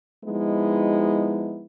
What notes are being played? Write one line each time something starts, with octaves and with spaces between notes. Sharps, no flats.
F3 G#3 B3 D#4 E4